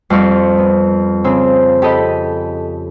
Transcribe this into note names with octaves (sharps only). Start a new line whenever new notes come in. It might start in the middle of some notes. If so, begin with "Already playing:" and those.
F2 G3 C4 D5 C#6 F6
B3
C#3 C4
G4 A4 D#5 B5